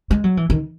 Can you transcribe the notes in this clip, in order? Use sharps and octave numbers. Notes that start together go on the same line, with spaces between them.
G#3
F#3
E3
D#3